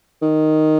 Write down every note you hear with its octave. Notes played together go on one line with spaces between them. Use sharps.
D#3